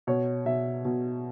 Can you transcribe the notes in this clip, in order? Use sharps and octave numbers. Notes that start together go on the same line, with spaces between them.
B2 C#5
B2 E5
B2